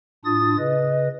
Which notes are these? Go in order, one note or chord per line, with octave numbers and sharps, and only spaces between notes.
A2 D4 F4 D#6 A6
C#3 B4 D#5